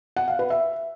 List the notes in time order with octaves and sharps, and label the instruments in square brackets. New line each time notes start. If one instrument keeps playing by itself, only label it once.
[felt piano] F#5
F5
B4
E5